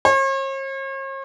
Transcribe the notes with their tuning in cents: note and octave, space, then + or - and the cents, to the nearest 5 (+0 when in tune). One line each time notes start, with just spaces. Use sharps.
C#5 -45